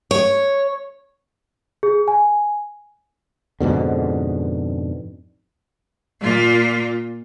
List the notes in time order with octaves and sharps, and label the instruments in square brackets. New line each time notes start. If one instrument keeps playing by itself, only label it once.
[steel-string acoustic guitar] C#5
[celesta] G#4
G#5
[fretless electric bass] F2 G#2 B2 D3
[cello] A#2 F4